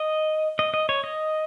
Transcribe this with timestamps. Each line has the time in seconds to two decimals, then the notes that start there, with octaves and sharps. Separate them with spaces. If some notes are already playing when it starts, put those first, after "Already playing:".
Already playing: D#5
0.59 D#5
0.74 D#5
0.89 C#5
1.04 D#5